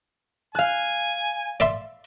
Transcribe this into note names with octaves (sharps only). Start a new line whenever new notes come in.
F5 G#5 F#6
D5 E5 C6